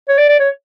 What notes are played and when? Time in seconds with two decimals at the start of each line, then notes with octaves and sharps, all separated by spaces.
0.08 C#5
0.18 D5
0.28 D5
0.40 C#5